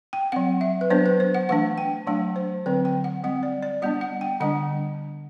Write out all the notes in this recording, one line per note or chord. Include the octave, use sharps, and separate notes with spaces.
G5
F#3 C4 F#5
E5
B4
F#3 B3 D4 C5
B4
C5
F#5
E3 A3 D4 F#5
G5
F#3 A3 D4 F#5
C5
D3 F#3 C4 B4
G5
F#5
G3 C4 F#5
D5
D5
G3 B3 D4 F#5
F#5
G5
D3 G3 D4 F#5